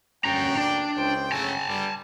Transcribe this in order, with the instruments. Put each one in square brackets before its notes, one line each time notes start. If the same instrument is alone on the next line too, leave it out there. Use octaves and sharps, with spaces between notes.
[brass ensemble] D2 A#3 G5 [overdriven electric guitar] C#4 A#5
[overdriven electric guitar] D4
[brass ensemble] C#2 C5 G5
[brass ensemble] C#3 A3 [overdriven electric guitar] G#5 A5
[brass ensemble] G2 D3 G3